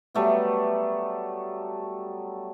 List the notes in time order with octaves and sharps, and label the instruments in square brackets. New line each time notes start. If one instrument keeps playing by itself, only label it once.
[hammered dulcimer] F#3 G3 A3 B3